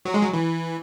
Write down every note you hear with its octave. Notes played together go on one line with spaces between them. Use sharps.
F#3
G#3
F#3
E3